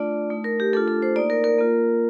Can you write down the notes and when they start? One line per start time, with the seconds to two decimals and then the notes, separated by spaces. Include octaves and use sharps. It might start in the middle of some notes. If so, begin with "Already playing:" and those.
Already playing: A3 D4 F4 D5
0.30 A3 D#4
0.44 A#4
0.60 G4
0.73 A3 D4 F4 A4
0.88 A4
1.02 C5
1.16 A#3 D#4 D5
1.30 A#4
1.44 A#4
1.58 A#3 F4